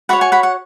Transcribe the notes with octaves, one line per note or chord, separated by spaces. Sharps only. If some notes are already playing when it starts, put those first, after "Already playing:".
F#4 C#5 F#5 B5
G#5 C#6
F#5 B5
F#5